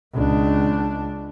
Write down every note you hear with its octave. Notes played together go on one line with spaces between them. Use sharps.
C#2 D4